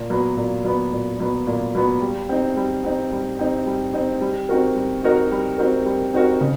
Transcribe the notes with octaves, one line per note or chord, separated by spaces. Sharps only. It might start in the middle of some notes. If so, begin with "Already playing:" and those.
Already playing: A#2
F#3 B3
A#2
F#3 B3
A#2
F#3 B3
A#2
F#3 B3
G3
C4 D#4
G3
C4 D#4
G3
C4 D#4
G3
C4 D#4
G3
C4 D#4 F#4 A#4
G3
C4 D#4 F#4 A#4
G3
C4 D#4 F#4 A#4
G3
C4 D#4 F#4 A#4
C#3